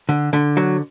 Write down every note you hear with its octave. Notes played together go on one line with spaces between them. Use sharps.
D3
D3
F#3